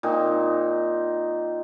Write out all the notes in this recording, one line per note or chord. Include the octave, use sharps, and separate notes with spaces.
A#2 C4 D#4